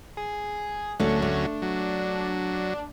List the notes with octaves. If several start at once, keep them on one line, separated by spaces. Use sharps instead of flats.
G#4
D2 F#3 A3 C#4 D4 A4
A3 D4
F#3